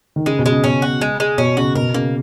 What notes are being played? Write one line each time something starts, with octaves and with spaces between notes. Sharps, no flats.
D#3
C#3 G#3
B2
G#3
C#3
B2 C#4
F#4
G#3
G#3
B2 C#4
C#3 F#4
B2 A#4
C#3 A#3